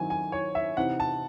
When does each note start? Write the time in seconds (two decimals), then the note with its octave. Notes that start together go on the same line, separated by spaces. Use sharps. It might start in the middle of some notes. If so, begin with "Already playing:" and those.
Already playing: D#3 F#3 C4 E4 G#5
0.10 G#5
0.32 C#5
0.55 E5
0.77 C3 E3 C4 D#4 F#5
1.00 A5